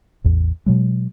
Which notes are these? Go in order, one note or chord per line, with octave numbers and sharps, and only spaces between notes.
A1 E2
B2 F#3 G#3